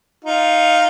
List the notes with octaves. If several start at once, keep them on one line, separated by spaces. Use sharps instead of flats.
D#4 F4